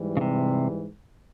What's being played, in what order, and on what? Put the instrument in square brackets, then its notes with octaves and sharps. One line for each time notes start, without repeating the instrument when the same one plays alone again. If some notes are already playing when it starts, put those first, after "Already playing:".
Already playing: [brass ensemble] G#2 E3 G3
[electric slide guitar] C#3
C3